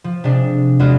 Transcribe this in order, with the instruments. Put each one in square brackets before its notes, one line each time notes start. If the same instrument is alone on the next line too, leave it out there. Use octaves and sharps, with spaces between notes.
[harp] F3
C3 G#3 D4
E2 G#3 F4 F#4